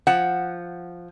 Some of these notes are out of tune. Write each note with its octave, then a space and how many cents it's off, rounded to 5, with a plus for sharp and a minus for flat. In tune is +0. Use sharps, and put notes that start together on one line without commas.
F3 +0 F#5 +0